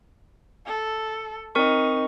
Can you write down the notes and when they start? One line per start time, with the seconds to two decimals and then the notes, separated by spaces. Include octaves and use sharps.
0.67 A4
1.55 C4 D#4 A#4 C#6